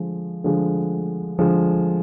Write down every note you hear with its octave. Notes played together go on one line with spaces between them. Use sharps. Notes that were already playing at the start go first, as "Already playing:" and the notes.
Already playing: D3 F3 G#3
D3 F3 G#3
D3 F3 G#3